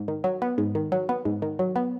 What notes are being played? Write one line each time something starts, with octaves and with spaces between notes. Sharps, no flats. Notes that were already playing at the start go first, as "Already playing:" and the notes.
Already playing: G#2
D#3
F#3
B3
G#2
D#3
F#3
B3
G#2
D#3
F#3
B3